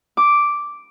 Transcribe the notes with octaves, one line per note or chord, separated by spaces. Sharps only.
D6